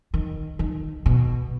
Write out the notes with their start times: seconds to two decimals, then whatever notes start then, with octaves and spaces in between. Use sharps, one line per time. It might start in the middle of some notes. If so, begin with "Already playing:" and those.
0.14 D#3
0.59 D#3
1.06 B2